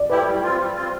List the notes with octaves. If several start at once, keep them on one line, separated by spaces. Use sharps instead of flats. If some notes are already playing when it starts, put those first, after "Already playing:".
Already playing: D5
A3 E4 G4 B4
G3
C4 F4
G3
C4 F4